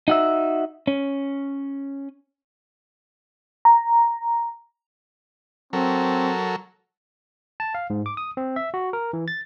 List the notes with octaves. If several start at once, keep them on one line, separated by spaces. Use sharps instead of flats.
D#4 F#4 E5
C#4
A#5
F#3 C4 A4 A#4
A5
F5
G#2
D6
D#6
C4
E5
F#4
A#4
E3
A6